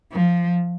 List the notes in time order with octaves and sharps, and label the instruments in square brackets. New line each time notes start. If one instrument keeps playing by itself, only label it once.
[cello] F3